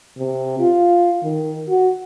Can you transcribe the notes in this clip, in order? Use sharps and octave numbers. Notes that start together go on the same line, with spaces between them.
C3
F4
D#3
F#4